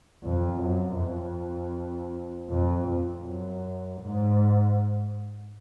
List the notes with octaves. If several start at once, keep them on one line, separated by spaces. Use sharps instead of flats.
F2
F#2
F2
F2
F2
F#2
G#2